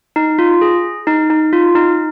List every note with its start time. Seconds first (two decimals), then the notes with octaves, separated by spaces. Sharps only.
0.16 D#4
0.39 F4
0.61 G#4
1.07 D#4
1.30 D#4
1.53 F4
1.75 D#4